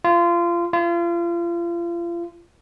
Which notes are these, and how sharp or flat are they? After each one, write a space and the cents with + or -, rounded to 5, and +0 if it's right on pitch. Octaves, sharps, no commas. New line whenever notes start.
F4 -25
F4 -35